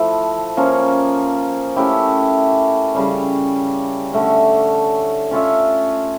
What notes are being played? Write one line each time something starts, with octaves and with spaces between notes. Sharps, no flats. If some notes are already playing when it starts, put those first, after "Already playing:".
Already playing: F3 A3 E4
F3 A#3 C#4
A3 C#4 E4 G4
C#3 G3 C#4
D3 A3 C#4
C#4 F4 C#5 E5